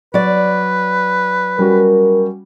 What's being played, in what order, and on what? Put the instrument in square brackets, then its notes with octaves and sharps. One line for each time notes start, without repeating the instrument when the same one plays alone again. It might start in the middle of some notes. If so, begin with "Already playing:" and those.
[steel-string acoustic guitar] F#3 D5 [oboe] B4
[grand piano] G3 C#4 F#4 [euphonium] A#4